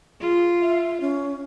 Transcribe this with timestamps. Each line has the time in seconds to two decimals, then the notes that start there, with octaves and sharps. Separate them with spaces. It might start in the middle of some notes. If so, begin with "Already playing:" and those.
0.21 F4 G#4
0.62 E5
1.01 C#4